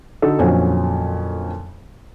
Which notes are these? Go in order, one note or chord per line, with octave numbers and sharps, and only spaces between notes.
D3 D#4 F#4 A4
F2 A#2 D3 F3 F#3 C#4